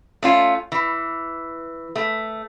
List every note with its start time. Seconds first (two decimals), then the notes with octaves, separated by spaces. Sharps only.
0.23 A3 C#4 F4
0.72 E3
1.95 A3